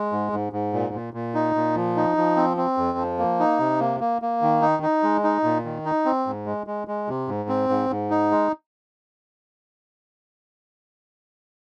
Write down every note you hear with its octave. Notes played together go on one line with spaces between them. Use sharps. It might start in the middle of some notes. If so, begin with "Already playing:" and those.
Already playing: G#3
G#2
G#2
G#2
A#2
A#2
A#2
D#4
A#2
F3
D#4
F3
C4
C4
F2
F3
A#3
D#4
C3
A#3
A#3
A#3
D#3
D#4
D#4
G#3
D#4
A#2
D#3
D#4
C4
G#2
G#3
G#3
G#3
C3
G#2
C4
G#2
G#2
D#4
G#3